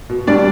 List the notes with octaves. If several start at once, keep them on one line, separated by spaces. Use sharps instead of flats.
B2
G3 D4 D5